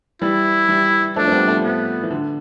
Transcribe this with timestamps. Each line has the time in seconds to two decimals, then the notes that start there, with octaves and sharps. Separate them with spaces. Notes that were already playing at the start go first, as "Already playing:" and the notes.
0.22 E3 G3 E4
0.69 E3 G3
1.16 F3 A3 D4
1.28 C4
1.32 G3 B3
1.47 F3 A3
1.64 B3
2.03 E3
2.11 D3